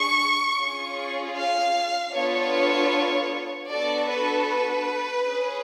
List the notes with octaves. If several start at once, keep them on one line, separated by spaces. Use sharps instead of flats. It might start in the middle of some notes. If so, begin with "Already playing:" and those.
Already playing: D4 G#4 C#6
C#4 F4 G#4
F5
B3 D4 F4 A4 C#5
B3 D4 F#4 A4 D5
B4
B4
C#4 G#4